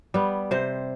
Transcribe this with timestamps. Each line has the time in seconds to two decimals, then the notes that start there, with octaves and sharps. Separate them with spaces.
0.14 G3 B3
0.51 C3 C5